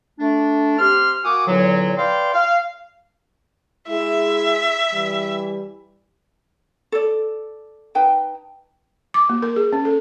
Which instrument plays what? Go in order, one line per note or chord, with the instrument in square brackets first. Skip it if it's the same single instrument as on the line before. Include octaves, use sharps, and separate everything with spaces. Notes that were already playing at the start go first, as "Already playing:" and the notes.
[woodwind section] A3 D4
C3 G4 C6 F6
A#3 F#4 F#5 G#5 D6 D#6
E2 A#2 D3 F#3
B4 D5 F5 G5 C6
F5
[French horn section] G#3 E4 G#4 [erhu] E5
[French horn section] E3 G3
[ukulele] A4 D5
D#4 B4 G5 A5
[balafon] D6
A#3
A#4
G#4
C#4
A4